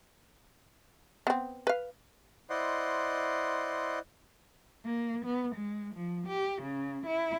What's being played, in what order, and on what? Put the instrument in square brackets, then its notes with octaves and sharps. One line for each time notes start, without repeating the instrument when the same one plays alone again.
[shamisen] B3 C4
B4 F5
[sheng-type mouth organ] E4 C5 D5 D#5 F#5 C6
[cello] A#3
B3
G#3
F3
G4
C#3
E4